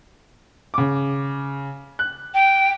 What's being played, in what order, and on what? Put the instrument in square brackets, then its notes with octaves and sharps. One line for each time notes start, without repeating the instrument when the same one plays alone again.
[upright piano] C#3 D6
F#6
[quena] G5